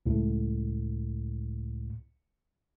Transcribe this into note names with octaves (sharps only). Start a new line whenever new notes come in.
C#2 A2